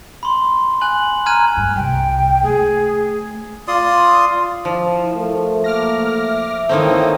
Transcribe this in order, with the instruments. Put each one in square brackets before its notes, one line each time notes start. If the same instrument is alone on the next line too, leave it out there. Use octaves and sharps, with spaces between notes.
[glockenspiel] B5 C6
G#5 F#6 F#7
G#5 A#5 F6 F#6 G#6 D#7
[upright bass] G2
[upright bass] C2 [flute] G5
[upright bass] A3 [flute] G#4
[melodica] F4 D5 C6 D#6
[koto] F3 [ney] E4
[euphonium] A3 [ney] A#4
[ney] A#3 [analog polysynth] D6 F6 A#6
[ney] E5
[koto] D#3 A#3 C4 [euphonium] E3 [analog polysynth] A4 C#5 D#6